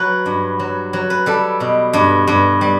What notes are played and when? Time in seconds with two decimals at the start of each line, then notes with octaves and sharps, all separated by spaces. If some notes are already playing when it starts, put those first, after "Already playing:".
Already playing: F#3 B4
0.26 G2
0.60 F#3
0.93 F#3
1.10 B4
1.26 G3 A4
1.60 B2
1.93 G2
2.27 G2
2.61 G3